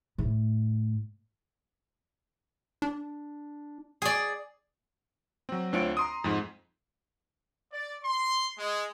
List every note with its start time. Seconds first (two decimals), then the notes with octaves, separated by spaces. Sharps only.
0.18 A2
2.82 D4
4.02 G#4 D5
5.49 F#3 C4
5.73 D2 C4 D4 F4 C#5 D7
5.97 A#5 C6 D#6
6.24 F2 G#2
7.72 D5
8.05 C6
8.59 G#3